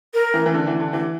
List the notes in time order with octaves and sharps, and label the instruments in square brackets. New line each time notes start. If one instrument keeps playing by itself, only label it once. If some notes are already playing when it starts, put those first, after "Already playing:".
[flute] A#4
[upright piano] E3
E3
D3
E3
D3
[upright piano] E3 [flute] G4